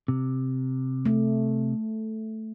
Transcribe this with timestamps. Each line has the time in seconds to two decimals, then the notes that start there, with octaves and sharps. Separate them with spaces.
0.08 C3
1.05 A3